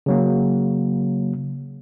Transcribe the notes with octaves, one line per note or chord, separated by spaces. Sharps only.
C#3 F#3 A#3